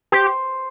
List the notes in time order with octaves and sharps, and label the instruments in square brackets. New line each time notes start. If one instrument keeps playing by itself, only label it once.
[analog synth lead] G4 [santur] C5